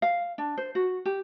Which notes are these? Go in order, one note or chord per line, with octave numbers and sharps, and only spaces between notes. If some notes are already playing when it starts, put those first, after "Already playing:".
F5
D4
C5
F#4
G4